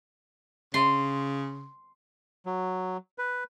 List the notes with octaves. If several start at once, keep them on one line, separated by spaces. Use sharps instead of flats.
C#3 C6
F#3
B4